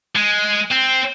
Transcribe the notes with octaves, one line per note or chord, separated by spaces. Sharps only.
G#3
C4